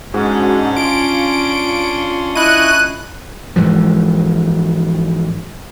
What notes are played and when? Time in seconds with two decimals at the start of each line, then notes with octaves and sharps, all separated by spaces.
0.14 G#2 C#4 D4 F#4
0.77 F4 C6 D7
2.35 E4 D#5 C#6 F#6 D#7
3.56 G#2 E3 F3